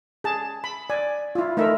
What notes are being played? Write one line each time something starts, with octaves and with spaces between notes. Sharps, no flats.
G#4 A5
B5
D5 G#5
E4 F4
A3 D#4 A#4 E5